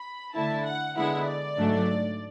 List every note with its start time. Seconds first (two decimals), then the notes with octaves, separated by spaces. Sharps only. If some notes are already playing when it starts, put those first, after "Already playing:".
Already playing: B5
0.34 D3 A3 E4 A5
0.65 F#5
0.96 D3 G#3 B3 E4 F#5
1.26 D5
1.57 G#2 F#3 A3 D4